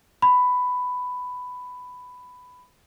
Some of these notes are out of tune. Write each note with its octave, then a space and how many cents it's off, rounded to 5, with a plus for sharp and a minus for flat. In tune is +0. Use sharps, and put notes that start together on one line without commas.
B5 +10